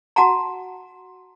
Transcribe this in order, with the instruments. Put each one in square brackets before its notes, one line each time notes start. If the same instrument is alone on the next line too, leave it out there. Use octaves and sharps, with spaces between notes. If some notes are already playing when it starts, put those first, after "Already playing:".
[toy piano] F#4 F#5 A5 A#5